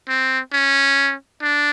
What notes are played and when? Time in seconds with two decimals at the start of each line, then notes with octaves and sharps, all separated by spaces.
0.08 C4
0.52 C#4
1.42 D4